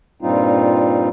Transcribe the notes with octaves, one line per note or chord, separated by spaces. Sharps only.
G2 A#2 G3 C4 D#4 F4